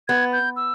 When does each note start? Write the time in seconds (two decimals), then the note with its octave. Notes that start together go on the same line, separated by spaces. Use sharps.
0.08 B3 G#6
0.33 G6
0.56 E6